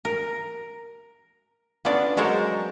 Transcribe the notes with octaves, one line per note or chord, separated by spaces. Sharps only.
A#4
B3 C#4 D4 F4 A4 D5
F#3 G#3 A4 A#4 C5 C#5